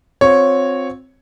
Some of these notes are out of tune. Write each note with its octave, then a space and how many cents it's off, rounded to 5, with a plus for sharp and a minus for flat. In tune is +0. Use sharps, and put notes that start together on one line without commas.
C4 +0 F4 +45 C#5 -5